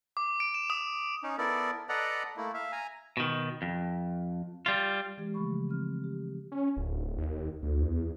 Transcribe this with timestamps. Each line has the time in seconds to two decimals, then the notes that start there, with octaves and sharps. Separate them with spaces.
0.17 D6
0.40 D7
0.54 E7
0.70 D#6
1.22 C#4 D#4
1.38 B3 E4 A4 A#4 D5
1.89 A4 B4 D5 D#5 F#5 A#5
2.37 A3 A#3 E4
2.54 E5 F5
2.72 G#5 A#5
3.17 B2 D#3
3.62 F2
4.66 G3 F4
5.18 E3 G#3 G4
5.34 C#3 F3 A3 B5 C#6
5.68 E3 C4 F6
6.04 G4
6.52 C#4
6.77 D1
7.18 D#2
7.63 D2
7.82 E2